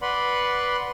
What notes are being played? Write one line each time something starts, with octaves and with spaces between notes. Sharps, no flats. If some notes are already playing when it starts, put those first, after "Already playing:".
B4 D5 F#5 B5 C6